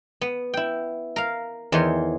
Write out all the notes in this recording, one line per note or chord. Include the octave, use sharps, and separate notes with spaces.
B3
E4 G5
A#4 F5
E2 D#3 E3 C5 C#5 C6